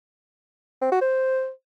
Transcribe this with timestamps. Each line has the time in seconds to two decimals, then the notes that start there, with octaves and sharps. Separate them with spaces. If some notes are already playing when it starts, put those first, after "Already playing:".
0.82 C4
0.91 F#4
1.01 C5